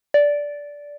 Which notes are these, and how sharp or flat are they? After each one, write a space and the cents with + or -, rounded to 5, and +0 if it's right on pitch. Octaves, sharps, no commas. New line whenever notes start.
D5 -10